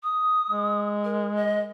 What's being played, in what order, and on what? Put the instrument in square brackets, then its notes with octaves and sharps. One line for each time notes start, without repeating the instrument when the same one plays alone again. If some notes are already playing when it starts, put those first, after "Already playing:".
[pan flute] D#6
[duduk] G#3
[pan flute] A#4
D#5